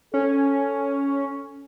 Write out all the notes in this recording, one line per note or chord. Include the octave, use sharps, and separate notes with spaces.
C#4 A4